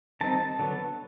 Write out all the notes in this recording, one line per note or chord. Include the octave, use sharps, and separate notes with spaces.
D#3 G3 C4 D#4 A5
D3 F#3 B3